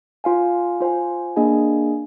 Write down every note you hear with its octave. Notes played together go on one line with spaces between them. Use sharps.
F4 C5 F5 G#5
F4 C5 F5 G#5
A#3 D4 G#4 D#5 G#5